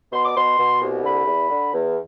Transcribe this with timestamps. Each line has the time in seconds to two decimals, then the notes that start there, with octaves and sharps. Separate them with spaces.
0.12 B2 C6
0.25 D6
0.36 B2 C6
0.58 B2
0.81 C2
1.04 D3 B5
1.26 E2
1.50 D3
1.73 E2